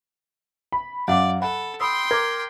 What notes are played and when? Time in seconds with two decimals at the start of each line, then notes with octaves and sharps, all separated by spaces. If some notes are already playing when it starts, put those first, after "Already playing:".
0.72 B5
1.08 F#2 D5 F5 F#5 D6
1.42 A4 F#5 B5
1.80 G5 B5 C6 D#6 E6
2.11 A#4 D6 G#6